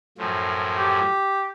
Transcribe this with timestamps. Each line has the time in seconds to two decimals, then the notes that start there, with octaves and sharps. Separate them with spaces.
0.18 F#2 A2 F3
0.78 G4